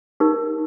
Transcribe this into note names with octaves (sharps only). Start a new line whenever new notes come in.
D#4 G4 A#4